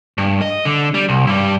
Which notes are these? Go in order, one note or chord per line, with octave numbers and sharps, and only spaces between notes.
G2
D#5
D3
G3
C2
G2 G3